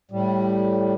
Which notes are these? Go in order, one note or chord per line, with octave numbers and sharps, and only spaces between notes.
A2 G3